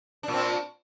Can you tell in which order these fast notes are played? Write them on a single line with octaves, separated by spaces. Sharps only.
D4 A#2 C4